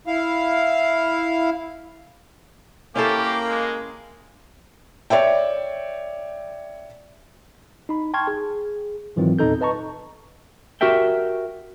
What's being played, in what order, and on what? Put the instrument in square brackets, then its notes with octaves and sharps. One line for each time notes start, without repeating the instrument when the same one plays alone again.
[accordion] E4 F5
[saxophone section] A#3 [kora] C#4 E4 A4 [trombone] G4
[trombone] G#3
[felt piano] C#5 D5 E5 G5
[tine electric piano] D#4 B5
G5 A5 C6 C#6 F6 G#6
G#4
G#2 D#3 E3 F#3 C4 F4
E2 A#2 C4 D#4 A4 G6
B4 D#5 A5 A#5 C#6
[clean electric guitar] F#4 G4 A#4 E5 G5